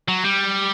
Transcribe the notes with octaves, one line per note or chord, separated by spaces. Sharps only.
F#3
G3